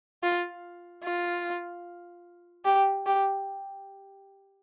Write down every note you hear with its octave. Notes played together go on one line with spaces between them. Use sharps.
F4
F4
G4
G4